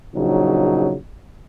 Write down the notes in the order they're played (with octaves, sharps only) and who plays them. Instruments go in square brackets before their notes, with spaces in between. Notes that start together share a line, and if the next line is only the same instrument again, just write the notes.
[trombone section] A#1 C#3 F#3 D#4